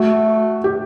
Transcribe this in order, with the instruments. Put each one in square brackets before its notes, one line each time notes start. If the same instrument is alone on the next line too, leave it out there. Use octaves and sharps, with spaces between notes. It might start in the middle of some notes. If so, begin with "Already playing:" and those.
Already playing: [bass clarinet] A3 [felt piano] F#4
[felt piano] G4